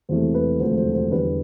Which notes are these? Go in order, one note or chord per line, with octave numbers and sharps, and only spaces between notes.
E1 E2 C3 E3 A3 C5
B4
E1 D2 C3 F3 A3 C5
C5
C5
E2 D3 G3 B4